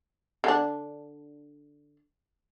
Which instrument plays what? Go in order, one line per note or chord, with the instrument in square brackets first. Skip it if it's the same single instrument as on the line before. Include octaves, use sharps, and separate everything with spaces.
[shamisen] D3 D4